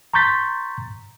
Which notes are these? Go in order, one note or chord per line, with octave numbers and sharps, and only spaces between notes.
A#5 C6 C#6 G6 A6 B6